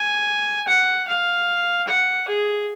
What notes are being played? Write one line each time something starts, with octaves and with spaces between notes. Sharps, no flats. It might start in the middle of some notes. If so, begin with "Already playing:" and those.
Already playing: G#5
F#5
F5
F#5
G#4